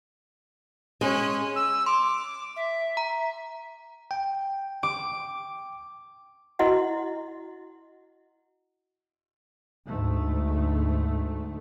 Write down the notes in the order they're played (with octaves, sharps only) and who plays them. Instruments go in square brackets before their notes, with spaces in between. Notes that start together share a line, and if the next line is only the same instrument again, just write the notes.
[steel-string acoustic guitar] G#3 [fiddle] C#4
[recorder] E6
[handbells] C6 [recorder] D6
[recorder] E5
[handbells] A#5
[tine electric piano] G5
[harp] D6
[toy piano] E4 F#4 D#5 F#5
[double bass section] D2 G#2 A3